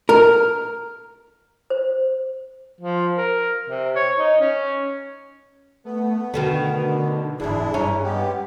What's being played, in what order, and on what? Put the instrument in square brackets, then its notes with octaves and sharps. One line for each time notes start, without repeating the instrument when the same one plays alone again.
[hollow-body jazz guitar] A#4
[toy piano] C5
[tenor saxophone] F3
A#4
C3
C#5
D#4
C#4
[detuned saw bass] A3 [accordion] B3
[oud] B2 D#3 A3 [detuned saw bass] D3
[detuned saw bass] E1 [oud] E2 G#2 [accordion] D4 E4 [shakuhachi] G#4
[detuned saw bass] G2 [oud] C#4 [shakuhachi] A#5
[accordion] G#3 B3 G4 [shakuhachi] G5